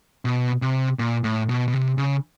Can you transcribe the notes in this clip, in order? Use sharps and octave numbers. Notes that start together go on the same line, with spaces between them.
B2
C3
A#2
A2
B2
B2
C3
C#3